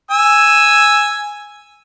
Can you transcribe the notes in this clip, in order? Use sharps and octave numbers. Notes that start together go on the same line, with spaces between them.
G#5 E6